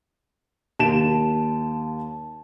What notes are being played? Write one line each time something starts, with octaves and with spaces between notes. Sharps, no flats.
D#2 A5 D7 E7